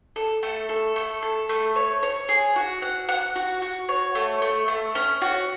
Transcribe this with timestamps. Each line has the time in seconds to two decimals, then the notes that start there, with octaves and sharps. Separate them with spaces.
0.16 A4
0.43 A3
0.69 A4
0.96 A3
1.22 A4
1.49 A3
1.76 C#5
2.03 C#5
2.29 G#4
2.56 F#4
2.82 F#5
3.09 F#5
3.36 F#4
3.62 F#4
3.89 C#5
4.15 A3
4.42 A3
4.68 A3
4.95 C#4
5.22 F#4